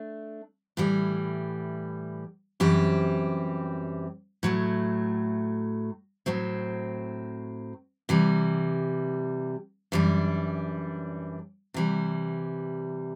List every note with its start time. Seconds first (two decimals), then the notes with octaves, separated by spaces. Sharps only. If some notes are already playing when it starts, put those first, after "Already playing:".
Already playing: A3 D4
0.77 A2 E3 G3
2.60 F#2 E3 G3 C4 G4
4.43 A2 F#3 A3
6.26 A2 F#3 C4
8.09 C3 E3 G3
9.92 F#2 E3 G3 D4
11.74 C3 E3 G3